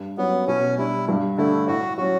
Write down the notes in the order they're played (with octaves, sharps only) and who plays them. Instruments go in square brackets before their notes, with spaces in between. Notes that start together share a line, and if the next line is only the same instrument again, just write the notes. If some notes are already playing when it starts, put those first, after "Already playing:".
Already playing: [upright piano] G2
[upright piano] F#3 C#4 [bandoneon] B3
[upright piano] B2 [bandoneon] C#4
[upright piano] G3 D4 [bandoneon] E4
[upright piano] G2
[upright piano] D3 A3 [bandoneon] E4
[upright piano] A2 [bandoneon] F#4
[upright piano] F#3 C#4 [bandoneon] F#4